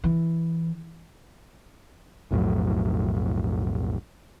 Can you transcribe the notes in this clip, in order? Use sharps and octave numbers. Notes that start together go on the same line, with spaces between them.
E3
B1 F2 A2 F#3